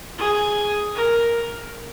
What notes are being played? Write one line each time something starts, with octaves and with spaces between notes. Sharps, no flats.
G#4
A#4